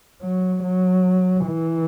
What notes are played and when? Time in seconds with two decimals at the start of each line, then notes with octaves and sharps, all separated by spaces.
0.22 F#3
0.63 F#3
1.45 E3